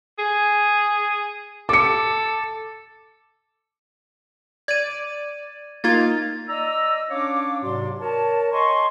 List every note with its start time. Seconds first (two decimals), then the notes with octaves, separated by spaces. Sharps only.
0.19 G#4
1.69 A4 D6 C#7
4.68 D5 G#6 D#7
5.84 A#3 D#4 F4 G#6 A6
6.48 D5 D#5 A#5 E6
7.10 C#4 D4 C#5 F5 D6
7.63 G#2 C3 F#3 F#4 D5 C6
8.00 A#4 C#5 A5
8.51 C#5 D#5 G#5 A#5 C6 C#6